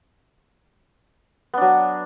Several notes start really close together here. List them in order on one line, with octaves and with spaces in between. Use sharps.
B3 D4 F#3